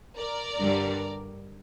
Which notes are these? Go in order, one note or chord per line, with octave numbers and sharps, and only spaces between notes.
A#4 D5
G2 D3 G3